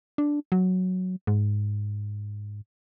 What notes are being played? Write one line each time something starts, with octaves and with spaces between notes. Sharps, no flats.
D4
F#3
G#2